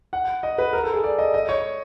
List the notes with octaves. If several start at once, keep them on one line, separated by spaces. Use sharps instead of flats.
F#5
D#5
B4
A#4
A4
G#4
D5
D#5
D#5
C#5